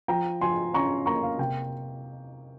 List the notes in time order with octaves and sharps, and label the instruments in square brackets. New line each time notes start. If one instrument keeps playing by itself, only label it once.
[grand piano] F3 G5 A#5
F3 G#5 C6
C#4 A#5 C#6
A#3 A#5 C#6
F5
C3 G5